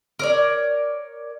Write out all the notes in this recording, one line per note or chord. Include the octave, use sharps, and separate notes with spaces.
A#4 C#5 D5